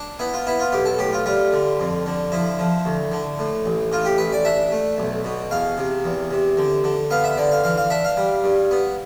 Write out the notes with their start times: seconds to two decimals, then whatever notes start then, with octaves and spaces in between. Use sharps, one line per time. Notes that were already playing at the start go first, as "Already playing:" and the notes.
Already playing: D4
0.19 B3 E4
0.34 F4
0.47 B3 E4
0.60 F4
0.72 B1 G4
0.86 A4
0.99 A2 G4
1.13 F4
1.26 G3 F4
1.52 D3
1.80 F2
2.06 D3
2.32 F3 E4
2.59 F3
2.85 D2
3.12 D3
3.39 A2
3.66 A1
3.92 A2 F4
4.05 G4
4.18 A1 B4
4.32 D5
4.45 D4 E5
4.72 A3
4.98 B1
5.24 B2
5.51 E2 F5
5.78 C3
6.04 E2
6.31 C3
6.57 D3
6.84 D3
7.10 B3 F5
7.24 E5
7.37 D3 D5
7.52 F5
7.64 E3 F5
7.77 F5
7.90 D4 E5
8.05 F5
8.17 G3
8.44 G2
8.71 B3